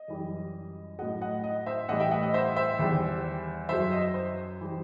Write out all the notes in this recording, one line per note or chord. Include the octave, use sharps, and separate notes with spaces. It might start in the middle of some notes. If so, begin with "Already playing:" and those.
Already playing: D#5
F#2 E3 G3
A2 F#3 D#5 F#5
D#5 F#5
D#5
C5 E5
A2 E3 G3 D#5 F#5
E5 G5
D#5 F#5
D#5
C5 E5
C5 E5
E2 D#3 G3
F#2 F#3 C5 E5
D#5
C5
E3 G3